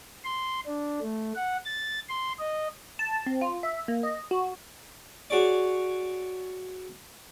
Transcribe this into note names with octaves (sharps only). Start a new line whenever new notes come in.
C6
D4
A3
F#5
A6
C6
D#5
A5
C4
F4
E5
A#3
D#5
F#4
F#4 G#4 C#5 D5